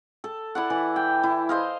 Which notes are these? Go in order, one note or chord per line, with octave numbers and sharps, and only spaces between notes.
A4
E4 D5 F#5
E3
G5
E4
C5 D#5 F5